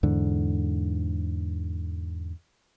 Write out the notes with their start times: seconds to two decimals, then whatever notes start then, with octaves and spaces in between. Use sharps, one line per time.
0.03 E2 G#2 D3